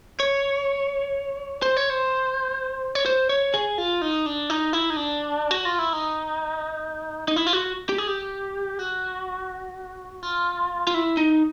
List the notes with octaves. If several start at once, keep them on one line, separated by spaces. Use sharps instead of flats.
C#5
C5
C#5
C5
C#5
C5
C#5
G#4
F4
D#4
D4
D#4
E4
D#4
D4
F#4
F4
E4
D#4
D#4
E4
F4
F#4
G4
G#4
G4
F#4
F4
F4
E4
D#4